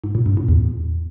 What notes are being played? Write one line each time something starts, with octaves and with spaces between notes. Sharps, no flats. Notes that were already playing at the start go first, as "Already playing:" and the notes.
G#2
A#2
G2
A2
E2